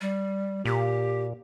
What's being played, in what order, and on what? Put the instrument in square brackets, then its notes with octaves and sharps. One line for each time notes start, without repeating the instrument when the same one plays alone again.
[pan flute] G3
[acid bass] A#2 [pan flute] G4